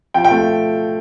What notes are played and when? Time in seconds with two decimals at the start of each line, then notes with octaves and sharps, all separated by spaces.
0.14 F3 G5
0.24 G5
0.31 A3